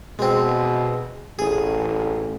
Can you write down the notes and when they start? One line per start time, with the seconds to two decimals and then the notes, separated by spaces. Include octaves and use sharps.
0.19 B2 G#3 C4
1.39 A1 G#4